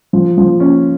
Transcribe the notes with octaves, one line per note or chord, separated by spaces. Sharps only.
F3
F3
C#4